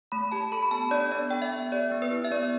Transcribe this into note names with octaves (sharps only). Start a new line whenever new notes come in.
A3 B5
G4 A5
A4 B5
B5
B3 A5
D4 D5
B3 D5
A4 G5
E5
B3
G4 D5
B3
B4
E4
E5
B3 D5